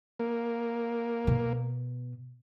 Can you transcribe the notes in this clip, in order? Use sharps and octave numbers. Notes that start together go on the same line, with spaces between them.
A#3
B2